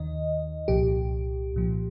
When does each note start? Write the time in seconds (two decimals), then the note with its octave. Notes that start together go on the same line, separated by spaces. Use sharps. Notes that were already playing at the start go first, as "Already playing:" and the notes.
Already playing: D#2 D#3 D#5
0.68 C2 A#2 F3 G4
1.54 C2 A#2 F3